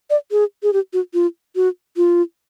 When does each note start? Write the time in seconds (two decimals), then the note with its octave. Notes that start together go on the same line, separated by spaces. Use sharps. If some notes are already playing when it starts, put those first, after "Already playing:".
0.10 D5
0.31 G#4
0.63 G#4
0.73 G4
0.93 F#4
1.14 F4
1.56 F#4
1.97 F4